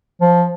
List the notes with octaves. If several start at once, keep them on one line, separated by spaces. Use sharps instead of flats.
F3